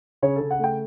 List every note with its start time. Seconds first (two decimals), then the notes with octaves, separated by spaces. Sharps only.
0.22 C#3 C#5
0.36 C#3 A4
0.51 F#5
0.59 A3 G5